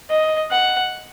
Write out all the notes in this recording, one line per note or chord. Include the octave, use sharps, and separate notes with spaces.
D#5
F#5